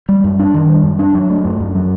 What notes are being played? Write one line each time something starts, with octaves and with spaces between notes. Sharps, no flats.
G3
F#2
D4
D#3
G3
F#2
D4
F#3
A3
F#2
F#2
F#3